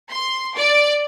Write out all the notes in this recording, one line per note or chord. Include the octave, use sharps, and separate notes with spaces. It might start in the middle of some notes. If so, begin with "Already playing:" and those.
C6
D5